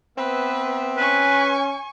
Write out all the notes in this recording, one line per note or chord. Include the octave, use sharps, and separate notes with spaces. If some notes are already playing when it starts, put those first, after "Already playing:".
B3 C4 B4 E5
C#4 B4 G#5 C#6